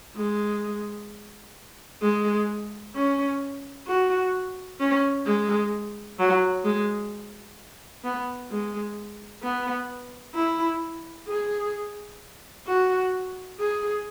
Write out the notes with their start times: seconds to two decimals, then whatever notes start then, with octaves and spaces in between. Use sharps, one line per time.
0.17 G#3
2.03 G#3
2.95 C#4
3.88 F#4
4.80 C#4
5.26 G#3
6.19 F#3
6.65 G#3
8.04 B3
8.50 G#3
9.43 B3
10.35 E4
11.28 G#4
12.67 F#4
13.60 G#4